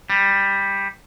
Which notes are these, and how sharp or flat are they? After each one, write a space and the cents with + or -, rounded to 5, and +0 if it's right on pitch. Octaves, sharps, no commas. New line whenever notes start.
G3 +5